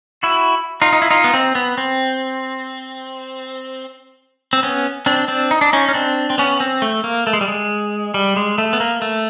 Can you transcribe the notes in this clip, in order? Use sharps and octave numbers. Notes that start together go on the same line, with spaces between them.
E4 F#4
D#4 F4
D#4
E4
D#4 F4
B3
C4
B3
C4
C4
B3 C#4
C4 D4
C4 D4
D#4
D4
C#4 D#4
C#4
C4 D4
C4
B3 C#4
C4
A3
A#3
A3
G#3
G3
G#3
G3
G#3
A3
B3
A#3
A3